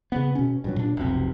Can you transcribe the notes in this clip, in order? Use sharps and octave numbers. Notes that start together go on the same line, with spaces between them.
C#3 B3
B2 C#4
G2 A#2 F#3
A#2 D4
F1 B1 C3